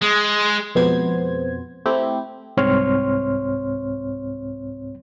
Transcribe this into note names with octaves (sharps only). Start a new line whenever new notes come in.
G#3
F2 B2 G#3 B3 C5 G#6
A3 C4 E4 G4
C2 G#2 C4 C#5 C6 F6